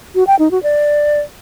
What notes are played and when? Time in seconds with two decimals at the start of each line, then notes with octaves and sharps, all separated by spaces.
0.15 F#4
0.27 G5
0.39 D#4
0.51 F#4
0.63 D5